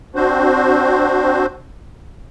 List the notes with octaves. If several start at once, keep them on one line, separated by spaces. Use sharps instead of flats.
C4 D4 F#4 C5